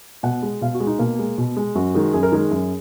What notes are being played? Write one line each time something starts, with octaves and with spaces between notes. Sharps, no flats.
B2 F#5
G#3
B2 F5
F#4
G#3
D#4
B2 A#3
G#3
B2
G#3
F#2 F#4
D#3 G#3
F#2 G#4
A#4
D#3 G#3 G#4
F#2